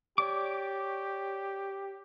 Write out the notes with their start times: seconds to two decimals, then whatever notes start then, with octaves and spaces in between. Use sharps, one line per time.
0.18 G4 C#5 D5 D6